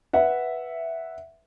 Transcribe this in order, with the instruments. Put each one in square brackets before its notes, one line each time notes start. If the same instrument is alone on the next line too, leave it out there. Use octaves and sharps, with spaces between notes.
[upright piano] B4 E5 F#5